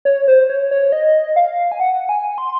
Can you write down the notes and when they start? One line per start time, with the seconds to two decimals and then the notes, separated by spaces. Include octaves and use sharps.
0.05 C#5
0.28 C5
0.50 C#5
0.71 C#5
0.92 D#5
1.36 F5
1.72 G#5
1.80 F#5
2.09 G#5
2.38 C6